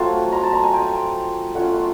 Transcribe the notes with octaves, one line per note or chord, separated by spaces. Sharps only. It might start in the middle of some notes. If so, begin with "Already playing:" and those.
Already playing: F#3 A3 C4 F4 A5
A#5
A5
A#5
G#5
G5
A3 C#4 F4 F#5
C6